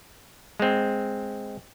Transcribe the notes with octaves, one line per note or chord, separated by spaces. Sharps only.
G#3 C4